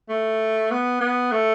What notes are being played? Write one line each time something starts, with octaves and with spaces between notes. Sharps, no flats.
A3
B3
B3
A3